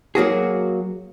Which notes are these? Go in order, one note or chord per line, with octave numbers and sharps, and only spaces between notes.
F#3 A#3 F#4 G#4